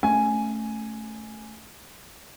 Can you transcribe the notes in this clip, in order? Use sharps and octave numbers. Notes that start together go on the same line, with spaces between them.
A3 C#4 G#5